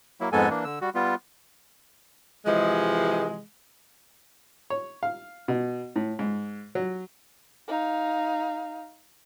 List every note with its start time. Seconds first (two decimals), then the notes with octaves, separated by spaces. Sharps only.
0.21 F#3 A#3 E4
0.32 F2 G#2 G#3 B3 A4 G#5
0.50 E3 A#3 D4
0.65 D3 E6
0.81 G3 F#4
0.95 G3 B3 F4
2.46 C3 E3 F3 G#3
4.70 C#5
5.03 F5
5.48 B2
5.96 A2
6.19 G#2
6.75 F#3
7.68 D#4 F5